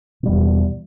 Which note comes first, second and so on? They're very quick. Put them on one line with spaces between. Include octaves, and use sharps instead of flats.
B2 G3 E2 E3